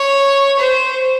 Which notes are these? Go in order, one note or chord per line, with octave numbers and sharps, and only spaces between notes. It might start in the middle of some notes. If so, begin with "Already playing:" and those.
Already playing: C#5
C5